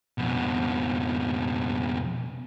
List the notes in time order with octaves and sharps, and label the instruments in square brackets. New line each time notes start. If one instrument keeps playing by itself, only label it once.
[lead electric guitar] F2 B2